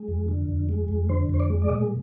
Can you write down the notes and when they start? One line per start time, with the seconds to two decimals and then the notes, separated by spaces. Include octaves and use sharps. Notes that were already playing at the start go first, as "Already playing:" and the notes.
Already playing: G#3
0.08 F2
0.28 D3
0.48 F2
0.69 G#3
0.88 F2
1.09 D3 C5
1.29 F2 C5
1.40 D5
1.50 G#3
1.62 D5
1.69 A#2 D#5